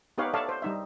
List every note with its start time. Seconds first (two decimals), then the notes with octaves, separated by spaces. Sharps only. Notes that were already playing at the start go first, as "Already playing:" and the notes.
0.18 B3 D#4 G4 B4 C#5 F5
0.34 A4 C#5 D5 E5 F5 A5
0.49 C5
0.62 G3 D#4 E5